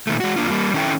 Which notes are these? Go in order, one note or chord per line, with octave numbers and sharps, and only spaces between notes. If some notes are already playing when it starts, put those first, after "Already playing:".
A#2 D#3 A3
G#3 F#4
F2 A#3 D4 F4
G3 A#3
D#3 C#4 E4 G#4 A4 G5